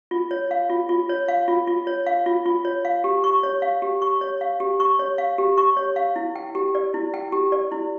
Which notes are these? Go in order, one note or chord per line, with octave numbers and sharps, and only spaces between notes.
F4
C#5
F5
F4
F4
C#5
F5
F4
F4
C#5
F5
F4
F4
C#5
F5
G4
C#6
C#5
F5
G4
C#6
C#5
F5
G4
C#6
C#5
F5
G4
C#6
C#5
F5
E4
G5
G4
D5
E4
G5
G4
D5
E4